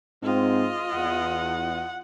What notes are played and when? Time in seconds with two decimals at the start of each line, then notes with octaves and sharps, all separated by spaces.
0.23 G#2 C4 F4 D#5
0.94 E2 F#5